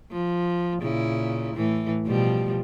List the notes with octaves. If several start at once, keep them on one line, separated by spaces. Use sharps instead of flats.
F3
A#2 C#3 E4
A2 E3
B2 F3 G3